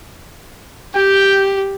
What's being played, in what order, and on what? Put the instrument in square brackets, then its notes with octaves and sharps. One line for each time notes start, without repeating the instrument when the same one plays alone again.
[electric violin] G4 [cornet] G5